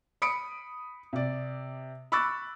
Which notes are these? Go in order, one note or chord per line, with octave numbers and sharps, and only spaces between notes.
B5 D#6 C#7 D7
C3 D5
B5 C#6 D6 E6 F#6 A6